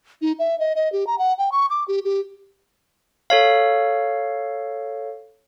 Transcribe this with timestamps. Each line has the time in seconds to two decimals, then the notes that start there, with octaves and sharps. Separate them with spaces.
0.22 D#4
0.39 E5
0.59 D#5
0.76 D#5
0.92 G4
1.07 A#5
1.19 F#5
1.38 G5
1.52 C#6
1.70 D6
1.88 G4
2.05 G4
3.30 A4 C#5 F5